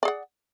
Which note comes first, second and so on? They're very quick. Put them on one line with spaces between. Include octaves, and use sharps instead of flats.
D5 G#4 F#5